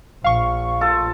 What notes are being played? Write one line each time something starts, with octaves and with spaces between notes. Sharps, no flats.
A#1 F5 C#6
F4 A4